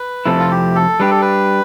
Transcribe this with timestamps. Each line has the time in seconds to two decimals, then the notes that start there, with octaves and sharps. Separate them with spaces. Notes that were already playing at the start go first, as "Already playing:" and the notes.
Already playing: B4
0.26 F2 C3 F3 A3 E4 A4
0.39 F4
0.51 G4
0.75 A4
1.00 G3 D4 G4 B4
1.11 A4
1.22 B4